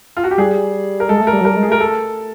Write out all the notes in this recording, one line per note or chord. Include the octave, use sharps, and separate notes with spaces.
F4
F#4
G4
G3 G#4
A#4
G#3 A4
A3
A#4
G3
F#3
G3 A#4
G#3
G#4
A3 A#4
A4